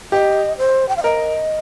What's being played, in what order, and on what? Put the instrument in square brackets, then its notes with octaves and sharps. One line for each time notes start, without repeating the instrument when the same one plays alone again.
[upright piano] G4 [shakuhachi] D#5
[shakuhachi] C5
G5
F5
[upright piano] A#4 [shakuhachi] D#5